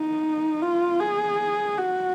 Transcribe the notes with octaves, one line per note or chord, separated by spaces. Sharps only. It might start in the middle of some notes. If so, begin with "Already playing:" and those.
Already playing: D#4
F4
G#4
F#4